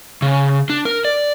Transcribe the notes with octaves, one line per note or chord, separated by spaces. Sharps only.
C#3
D4
A#4
D5